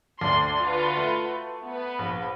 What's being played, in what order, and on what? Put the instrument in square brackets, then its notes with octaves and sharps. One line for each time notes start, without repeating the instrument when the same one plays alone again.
[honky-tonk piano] D2 A3 D5 [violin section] C6
[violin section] F4 F#4 B4
[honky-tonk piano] A3
[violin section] B3 B4
[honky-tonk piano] A#1